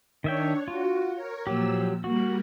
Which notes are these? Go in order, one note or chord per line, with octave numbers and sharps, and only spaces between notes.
D#3 D4 C#5 E5 G5
F4 F#4
A#4 C#5
A#2 F3 F#3 G4 E6
G3 A#3 F#4